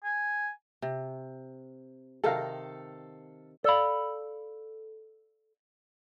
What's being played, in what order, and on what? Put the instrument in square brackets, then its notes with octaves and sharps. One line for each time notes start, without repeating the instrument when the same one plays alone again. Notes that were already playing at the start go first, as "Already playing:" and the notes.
[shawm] G#5
[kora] C3
[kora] C3 D#3 D#4 [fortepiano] A4 F5
[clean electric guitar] A4 B5 [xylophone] D5 F5